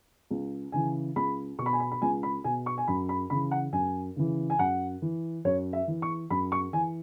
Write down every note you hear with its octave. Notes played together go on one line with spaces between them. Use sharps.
C#2
C#3 E3 G#5
C#2 B5
B2 C#6
B5
G#5
B5
B5
C#2 G#5
B5
B2 G#5
C#6
G#5
F#2 B5
B5
C#3 E3 B5
F#5
F#2 G#5
C#3 E3
G#5
F#2 F#5
E3
F#2 C#5
E5
E3
C#6
F#2 B5
C#6
E3 G#5